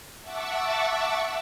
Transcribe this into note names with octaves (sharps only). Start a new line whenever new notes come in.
E5 F#5 A5 C#6 D6 E6